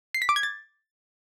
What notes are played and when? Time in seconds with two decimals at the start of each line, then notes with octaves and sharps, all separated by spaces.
0.14 C7
0.22 B6
0.29 D6
0.36 G#6
0.43 A6